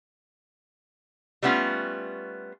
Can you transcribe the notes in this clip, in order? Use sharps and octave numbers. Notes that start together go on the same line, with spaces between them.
G3 A3 B3 C#4 F4